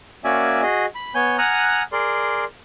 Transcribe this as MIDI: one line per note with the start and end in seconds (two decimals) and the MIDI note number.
0.24 0.62 58
0.24 0.62 61
0.24 0.62 66
0.24 0.62 74
0.24 0.62 76
0.24 0.62 80
0.62 0.86 66
0.62 0.86 68
0.62 0.86 75
0.95 1.13 83
1.15 1.37 59
1.15 1.37 73
1.15 1.37 80
1.15 1.37 91
1.38 1.83 78
1.38 1.83 80
1.38 1.83 82
1.38 1.83 87
1.38 1.83 89
1.38 1.83 90
1.92 2.45 68
1.92 2.45 70
1.92 2.45 74
1.92 2.45 84